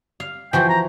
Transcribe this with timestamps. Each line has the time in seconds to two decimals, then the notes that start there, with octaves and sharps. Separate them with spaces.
0.20 F5
0.53 E3 F3 F#4 G5
0.69 A#5